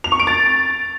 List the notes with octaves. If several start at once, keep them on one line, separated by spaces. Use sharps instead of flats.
F7
C#6
D7
A6